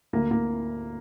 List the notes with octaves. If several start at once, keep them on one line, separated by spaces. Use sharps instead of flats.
D2 A#3
A#3